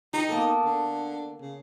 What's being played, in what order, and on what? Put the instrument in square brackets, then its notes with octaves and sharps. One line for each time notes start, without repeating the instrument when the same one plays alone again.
[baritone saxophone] D#4 [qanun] G4
[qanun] A#3 B3 A4
[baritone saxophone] D3
C#3